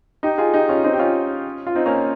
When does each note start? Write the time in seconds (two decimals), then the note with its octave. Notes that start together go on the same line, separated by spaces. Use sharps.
0.23 D#4 G4
0.38 F4 G#4
0.54 D#4 G4
0.69 C#4 F4
0.84 C4 D#4
0.93 G4
0.99 C#4 F4
1.67 F4
1.75 C4 D#4
1.86 A#3 C#4